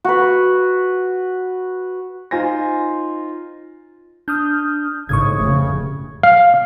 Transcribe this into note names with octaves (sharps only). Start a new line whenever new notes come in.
F#4 B4
D#4 F4 C5 G#5 A#6
D4 D#6 F6 G6
G#1 A2 C#3 C#6 D#6 G#6
F1 C#3 A3
F5